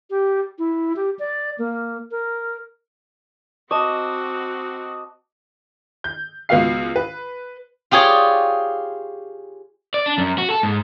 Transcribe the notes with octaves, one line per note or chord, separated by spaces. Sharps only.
G4
E4
G4
D5
A#3
A#4
C4 F#4 D#5 A5 C#6 D6
G6
C#2 B3 F4 F#4 F5 C7
B4
F4 G4 G#4 C#5 D5
D5
D4
F#2
F#4
A4
G#2